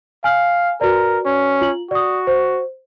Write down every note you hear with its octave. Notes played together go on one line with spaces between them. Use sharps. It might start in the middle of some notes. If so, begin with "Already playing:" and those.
F5 G#5 F6
F#4 A#4 B4 D5
C#4
F4 F#7
F#4 D5 D#6
C5